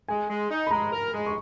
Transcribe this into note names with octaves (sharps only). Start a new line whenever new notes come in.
G#3 G#5
G#3
D#4
B5
G#3 A#5
A#4
G#3
C#6